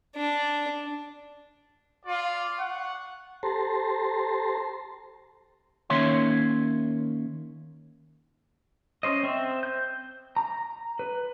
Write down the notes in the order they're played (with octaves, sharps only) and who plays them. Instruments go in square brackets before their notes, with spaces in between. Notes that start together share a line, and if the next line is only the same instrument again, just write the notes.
[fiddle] D4
[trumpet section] F4 D5
F#5 C#6
[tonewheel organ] G4 A4 C5 A5 A#5 C6
[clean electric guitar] D#3 A#3 C#4 C#5 E5 C6
[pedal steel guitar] C#4 C5 D#5
C4 C5 E5
G6
A#5
B4